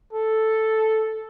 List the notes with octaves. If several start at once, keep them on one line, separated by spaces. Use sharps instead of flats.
A4